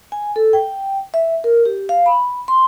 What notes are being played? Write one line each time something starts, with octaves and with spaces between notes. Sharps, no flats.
G#5
A4
G5
E5
A#4
G4
F5
B5
C6